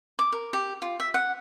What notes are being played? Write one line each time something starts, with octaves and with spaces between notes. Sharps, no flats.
D6
A#4
G4
F4
E5
F#5